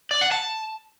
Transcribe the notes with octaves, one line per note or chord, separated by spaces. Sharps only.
D5
F#5
A5